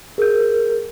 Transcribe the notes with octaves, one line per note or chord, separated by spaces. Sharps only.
G#4 A#4 G6